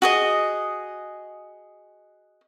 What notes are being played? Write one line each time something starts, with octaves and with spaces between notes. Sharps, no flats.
F#4 G#4 D#5